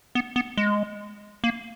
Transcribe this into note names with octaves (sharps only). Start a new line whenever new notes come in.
B3
B3
G#3
A#3